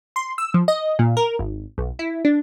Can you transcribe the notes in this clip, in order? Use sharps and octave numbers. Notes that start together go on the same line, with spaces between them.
C6
E6
F3
D#5
A#2
A#4
G#1
B1
E4
D4